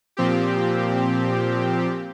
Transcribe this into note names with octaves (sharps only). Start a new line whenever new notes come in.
A#2 F3 C4 G4